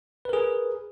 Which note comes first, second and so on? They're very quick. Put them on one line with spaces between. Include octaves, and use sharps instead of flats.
B4 A#4 G#4